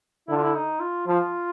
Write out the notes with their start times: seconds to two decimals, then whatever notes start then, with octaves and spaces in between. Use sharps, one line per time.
0.28 D3 E4
0.37 F4
0.43 E4
0.55 D#4
0.80 F4
1.07 F3 F4